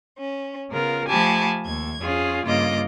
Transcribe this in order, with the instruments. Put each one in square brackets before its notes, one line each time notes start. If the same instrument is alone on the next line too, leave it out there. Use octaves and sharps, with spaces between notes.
[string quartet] C#4
C#3 B3 F4 A#4
F3 A3 G4 G#5 A5 B5
D#2 G#6
F2 C#4 F4 G#4
G2 C#3 A#3 F4 D#5 D6